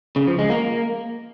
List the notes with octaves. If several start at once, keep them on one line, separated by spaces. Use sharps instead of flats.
C#3
F3
G#3
A#3